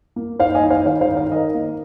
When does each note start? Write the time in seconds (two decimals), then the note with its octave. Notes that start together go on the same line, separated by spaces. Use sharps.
0.16 A#3
0.39 D#4 C5 F5
0.55 D#5 G#5
0.63 D#3
0.70 C5 F5
0.86 D#3 C5 F5
1.01 C5 F5
1.09 D#4
1.17 C5 F5
1.32 D#3 A#4 D#5
1.55 A#3